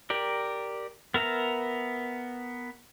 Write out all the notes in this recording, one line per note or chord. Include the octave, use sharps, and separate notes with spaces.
G4 A#4 D5
B3 A#4 E5 A#5